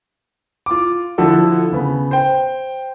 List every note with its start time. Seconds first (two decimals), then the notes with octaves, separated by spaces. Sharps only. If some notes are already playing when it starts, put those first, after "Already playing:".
0.66 F4 D6
1.18 D3 F3 E4 F#4 A4
1.72 C#3 B3
2.11 C5 G5